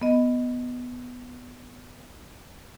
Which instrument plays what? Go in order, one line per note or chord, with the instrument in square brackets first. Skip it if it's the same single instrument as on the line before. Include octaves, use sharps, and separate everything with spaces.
[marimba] B3 D#5